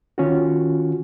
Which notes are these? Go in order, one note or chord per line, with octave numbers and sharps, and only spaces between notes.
D#3 C#4 F4 F#4